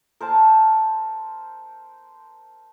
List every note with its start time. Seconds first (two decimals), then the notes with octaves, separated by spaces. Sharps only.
0.20 A#4 C5 A5